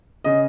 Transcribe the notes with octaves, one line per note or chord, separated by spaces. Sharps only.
C#3 D#5